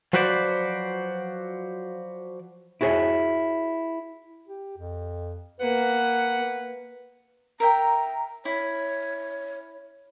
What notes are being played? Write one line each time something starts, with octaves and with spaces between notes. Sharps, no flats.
F3 F#3 F#4 B4 C5 D5
E4 F#4 G#4 B4 C#5 E5
G4
F2
A#3 B4 F#5
A#4 E5 G5 A#5
E4 C#5